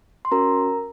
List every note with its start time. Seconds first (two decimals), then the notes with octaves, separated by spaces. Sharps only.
0.25 C6
0.31 C#4 F#4 A#4 A#5